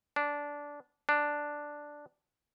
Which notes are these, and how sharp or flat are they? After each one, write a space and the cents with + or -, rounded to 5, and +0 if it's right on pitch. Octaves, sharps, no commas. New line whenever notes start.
D4 -15
D4 +0